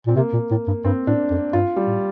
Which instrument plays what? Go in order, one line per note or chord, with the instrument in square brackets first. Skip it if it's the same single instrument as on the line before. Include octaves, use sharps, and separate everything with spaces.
[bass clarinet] A#2 [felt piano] C4
[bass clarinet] C3 [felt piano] A#3
[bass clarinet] A#2
A2
G2
[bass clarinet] G2 [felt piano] C4
[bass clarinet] A2 [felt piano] D4
[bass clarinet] F2
[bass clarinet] G2 [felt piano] F4
[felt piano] G3
[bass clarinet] A2